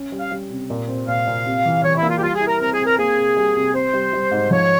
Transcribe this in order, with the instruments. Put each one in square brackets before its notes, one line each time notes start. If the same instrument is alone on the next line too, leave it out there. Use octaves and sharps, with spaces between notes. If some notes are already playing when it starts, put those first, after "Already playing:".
Already playing: [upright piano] C#4
G3
[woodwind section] F5
[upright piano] G3
C3
A#2
C4
[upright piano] A#2 [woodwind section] F5
[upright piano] A#2
C3
E3
[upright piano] E3 [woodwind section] C#5
[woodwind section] E4
[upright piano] A#3
[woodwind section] F4
G4
[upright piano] G3 [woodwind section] F4
[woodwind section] G#4
[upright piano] E4
[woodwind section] A#4
[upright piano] C4 [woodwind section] A#4
[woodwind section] G#4
[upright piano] C4
[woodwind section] A#4
[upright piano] A#3 [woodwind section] G#4
[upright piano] C3
G3
C3
[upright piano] C4 [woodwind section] C5
[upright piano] G3
G3
G#2
[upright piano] F3 [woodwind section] C#5